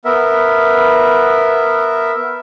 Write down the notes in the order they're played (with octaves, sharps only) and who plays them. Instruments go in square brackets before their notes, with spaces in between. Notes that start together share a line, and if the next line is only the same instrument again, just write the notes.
[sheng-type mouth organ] B3 A#4 E5